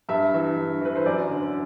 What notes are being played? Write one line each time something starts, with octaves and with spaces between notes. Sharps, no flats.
G2 E5
E3
G2
E3 B4
C5
F#2 D5
D3